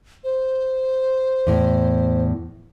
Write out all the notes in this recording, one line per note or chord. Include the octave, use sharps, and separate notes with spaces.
C5
E2 A2